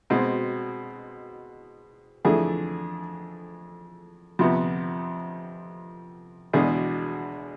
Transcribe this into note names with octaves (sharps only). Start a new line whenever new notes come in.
B2 G#3 C4
F2 E3 A3 D4 G#4
F2 C3 F3 B3
E2 B2 G#3 D4 G#4